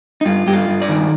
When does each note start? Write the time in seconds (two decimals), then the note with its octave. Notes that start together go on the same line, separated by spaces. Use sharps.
0.21 D#4
0.25 G2 F4
0.47 G2 G4
0.53 F4
0.68 G2
0.82 D5
0.89 D#3